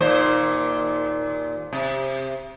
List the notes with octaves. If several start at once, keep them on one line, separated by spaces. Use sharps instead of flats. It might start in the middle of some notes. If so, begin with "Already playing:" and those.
D#2 A#2 C5
C3